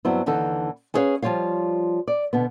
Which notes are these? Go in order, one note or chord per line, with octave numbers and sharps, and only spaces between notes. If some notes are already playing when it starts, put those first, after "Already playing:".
G2 F#3 B3 C4 E4
D#2 D3 E3 D#4 A4
C#4 E4 G#4 B4 C#5 F5
F3 G3 F4 C#5 F5
D5
B2 D3 B3